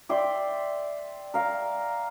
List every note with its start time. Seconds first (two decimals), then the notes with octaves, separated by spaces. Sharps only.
0.09 D5 E5 G5 C6
1.34 A#4 F5